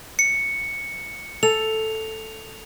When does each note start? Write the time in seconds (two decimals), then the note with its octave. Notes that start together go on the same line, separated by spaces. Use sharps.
0.19 C#7
1.43 A4 F7